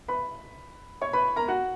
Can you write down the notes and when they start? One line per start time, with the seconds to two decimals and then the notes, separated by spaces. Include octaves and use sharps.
0.08 B4 B5
1.01 C#5 C#6
1.13 B4 B5
1.36 A#4 A#5
1.48 F#4 F#5